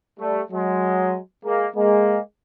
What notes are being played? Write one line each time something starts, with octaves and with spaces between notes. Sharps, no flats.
G3 A3
F#3 G#3
G#3 A#3
G#3 A#3